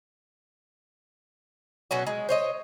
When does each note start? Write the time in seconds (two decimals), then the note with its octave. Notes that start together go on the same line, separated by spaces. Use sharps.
1.91 B2 F#3 C#4 F#4
2.07 G#3
2.29 C5 C#5 D#5